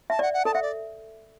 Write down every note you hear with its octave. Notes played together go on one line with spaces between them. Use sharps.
E5 A5
D5 F#5
F#5
A4 A5
E5 F#5
D5